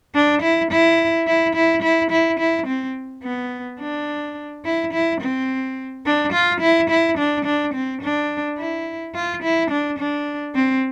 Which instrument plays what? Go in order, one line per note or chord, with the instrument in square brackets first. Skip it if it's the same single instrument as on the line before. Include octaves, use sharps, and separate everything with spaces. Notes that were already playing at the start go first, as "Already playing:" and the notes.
[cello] D4
E4
E4
E4
E4
E4
E4
E4
C4
B3
D4
E4
E4
C4
D4
F4
E4
E4
D4
D4
C4
D4
E4
F4
E4
D4
D4
C4